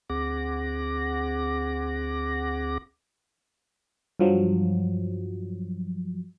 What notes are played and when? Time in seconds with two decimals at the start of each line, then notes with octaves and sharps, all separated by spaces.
0.10 D2 C4 G#4 F#5 D6 A#6
4.19 G2 F3 F#3